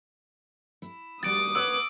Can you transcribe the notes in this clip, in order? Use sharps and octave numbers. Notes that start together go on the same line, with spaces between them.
E4
G3 F#4 D6 D#6 A6 D7
B4 C#5 F#5 E6